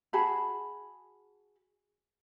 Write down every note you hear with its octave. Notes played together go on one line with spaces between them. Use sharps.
F#4 G#4 A5 B5